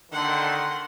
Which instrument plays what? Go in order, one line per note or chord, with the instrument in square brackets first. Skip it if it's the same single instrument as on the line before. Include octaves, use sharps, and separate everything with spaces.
[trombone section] D3 D#3 [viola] F#5 C6